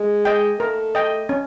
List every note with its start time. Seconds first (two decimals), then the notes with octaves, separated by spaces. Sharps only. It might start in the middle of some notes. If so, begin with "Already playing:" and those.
Already playing: G#3
0.25 D#5 G5
0.60 A3 A#4
0.95 D#5 G5
1.29 C#4